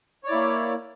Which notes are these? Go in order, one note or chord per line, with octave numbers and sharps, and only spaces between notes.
A#3 E4 C#5 D5